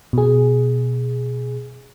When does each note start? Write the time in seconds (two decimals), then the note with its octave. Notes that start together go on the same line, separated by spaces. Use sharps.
0.13 B2 G#4